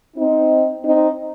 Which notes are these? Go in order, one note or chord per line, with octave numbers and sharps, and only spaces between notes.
C4 D#4
C4 D#4